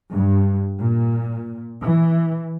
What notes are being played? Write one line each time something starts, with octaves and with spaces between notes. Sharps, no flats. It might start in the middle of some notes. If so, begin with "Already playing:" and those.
G2
A#2
E3